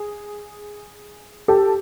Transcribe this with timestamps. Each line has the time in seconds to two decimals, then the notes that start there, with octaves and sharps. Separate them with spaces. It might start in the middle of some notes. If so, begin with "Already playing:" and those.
Already playing: G#4
1.48 G4 A4